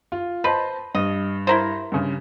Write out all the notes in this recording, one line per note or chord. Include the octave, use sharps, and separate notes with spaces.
F4
B4 C5 D#5 A5
G2 D#5
E4 A#4 C5
G2 C#3